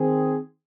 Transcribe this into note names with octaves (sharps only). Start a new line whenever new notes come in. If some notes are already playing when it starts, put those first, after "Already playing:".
Already playing: D#3 C4 G#4